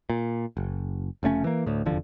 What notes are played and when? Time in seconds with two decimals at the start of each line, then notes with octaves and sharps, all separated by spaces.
0.10 A#2
0.57 F#1
1.23 F1 C#3 A3 C#4
1.44 E3 A#3
1.66 D2 A2
1.86 F1 E2 D3 F3